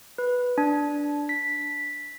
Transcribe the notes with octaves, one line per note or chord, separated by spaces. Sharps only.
B4
D4
B6